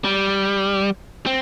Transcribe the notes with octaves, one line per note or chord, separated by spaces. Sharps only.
G3
C4